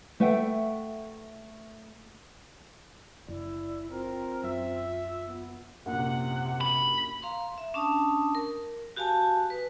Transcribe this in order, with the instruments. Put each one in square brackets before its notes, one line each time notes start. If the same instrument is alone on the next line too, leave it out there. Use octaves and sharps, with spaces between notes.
[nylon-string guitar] A3 B4 E5 F#5 G5
[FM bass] F#1 [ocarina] E4 [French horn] D5
[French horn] C4 [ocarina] F4 [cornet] A#4
[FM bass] F#2 [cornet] E5
[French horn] B3
[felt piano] A#1 F#2 [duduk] C3 [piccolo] F#5
[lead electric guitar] B5
[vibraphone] F5 A#5 C6
E5
C#4 D4 A5 D#6
A#4
F#4 G4 F5 G#5 A5
B4